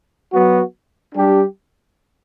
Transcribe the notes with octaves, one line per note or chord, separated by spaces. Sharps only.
F#3 B3 F#4
G3 D4 G4